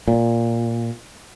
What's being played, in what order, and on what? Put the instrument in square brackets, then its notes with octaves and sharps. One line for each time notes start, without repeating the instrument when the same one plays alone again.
[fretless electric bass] A#2